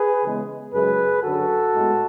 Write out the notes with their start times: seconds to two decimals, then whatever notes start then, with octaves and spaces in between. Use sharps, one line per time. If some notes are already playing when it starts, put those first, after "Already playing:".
Already playing: G#4 B4
0.24 C#3 E3 G#3 B3
0.73 F#2 C#3 G#3 G#4 B4
1.23 F#2 D3 F#3 F#4 A4
1.74 A2 G#3 B3